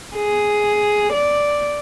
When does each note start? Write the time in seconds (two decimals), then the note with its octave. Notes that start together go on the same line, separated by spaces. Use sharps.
0.17 G#4
1.12 D5